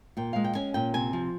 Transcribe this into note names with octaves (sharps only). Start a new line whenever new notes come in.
A#2 G5
G#3 F5
G5
C#4 G#5
A#2 G5
C3 G#5
F3